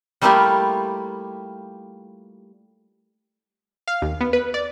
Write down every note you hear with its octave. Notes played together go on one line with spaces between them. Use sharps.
G3 A3 A#3 E4 F4 G4
F5
D#2
B3
B4
D5